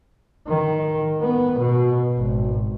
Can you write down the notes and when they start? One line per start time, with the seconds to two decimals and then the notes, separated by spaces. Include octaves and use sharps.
0.48 D#3
1.21 B3
1.59 B2
2.17 G#1